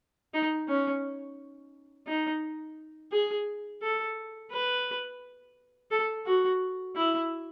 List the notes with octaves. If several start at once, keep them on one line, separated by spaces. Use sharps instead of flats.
D#4
C#4
D#4
G#4
A4
B4
A4
F#4
E4